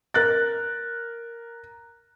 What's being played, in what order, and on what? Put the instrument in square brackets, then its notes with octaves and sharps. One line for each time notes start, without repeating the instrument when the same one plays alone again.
[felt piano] A#4 F#6 A6